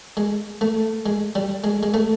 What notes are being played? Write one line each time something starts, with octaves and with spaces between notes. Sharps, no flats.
G#3
A3
G#3
G3
G#3
G#3
A3